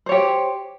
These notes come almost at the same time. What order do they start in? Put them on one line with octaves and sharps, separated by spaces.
C5 C#5 G4